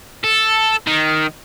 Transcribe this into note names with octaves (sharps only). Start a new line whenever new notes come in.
A4
D#3